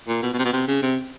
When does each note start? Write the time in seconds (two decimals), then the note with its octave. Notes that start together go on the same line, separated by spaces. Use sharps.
0.08 A#2
0.23 B2
0.34 B2
0.38 C3
0.45 B2
0.53 C3
0.68 C#3
0.82 C3